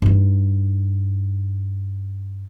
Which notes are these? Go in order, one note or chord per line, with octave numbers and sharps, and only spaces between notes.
G2 D#4